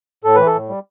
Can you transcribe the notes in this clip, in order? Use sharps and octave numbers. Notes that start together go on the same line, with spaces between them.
A2 A4
E3 B4
A4
A2
G3